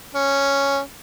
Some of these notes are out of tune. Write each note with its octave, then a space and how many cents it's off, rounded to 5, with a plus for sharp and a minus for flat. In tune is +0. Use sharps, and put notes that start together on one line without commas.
C#4 +0